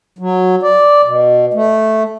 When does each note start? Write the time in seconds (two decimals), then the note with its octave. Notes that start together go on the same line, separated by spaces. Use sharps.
0.19 F#3
0.62 D5
1.04 B2
1.54 A3